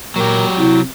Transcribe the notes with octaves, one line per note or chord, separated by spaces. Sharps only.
A#2 F#3 G4 A#4
C3 E4